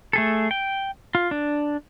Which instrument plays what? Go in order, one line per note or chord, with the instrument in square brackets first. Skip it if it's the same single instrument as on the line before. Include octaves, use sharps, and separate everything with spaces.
[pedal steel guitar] A3 G#4 A4
G5
F4
D4